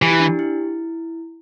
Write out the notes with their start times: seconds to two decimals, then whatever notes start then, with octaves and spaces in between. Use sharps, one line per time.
0.01 E3 G4
0.11 E4
0.20 D4
0.29 G4
0.39 E4